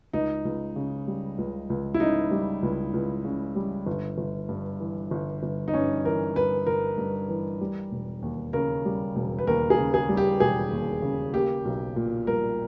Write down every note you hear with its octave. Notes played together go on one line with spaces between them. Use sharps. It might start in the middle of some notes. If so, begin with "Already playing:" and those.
C#2 D#4
C#2
C#3
G3
C#2
C#2
E4
C#3 D#4
G3
C#2
C#2
C#3
G3
G1
G1
G2
E3
G1
G1
D#4
G2 C#4
E3 A#4
G1 B4
G1 A#4
G2
E3
G3
E1
D#2
C#3 A#4
G3
E1
B4
D#2 A#4
G#4
C#3
G#4
G3
G4
E1 G#4
D#2
C#3
A#3 G4
B1
A#2
G3 A#4